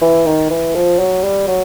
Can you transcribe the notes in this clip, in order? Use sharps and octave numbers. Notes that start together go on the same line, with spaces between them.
E3
D#3
E3
F3
F#3
G3
F#3